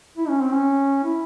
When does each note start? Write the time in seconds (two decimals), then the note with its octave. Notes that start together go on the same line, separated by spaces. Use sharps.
0.17 E4
0.28 C#4
0.41 C4
0.53 C#4
1.04 E4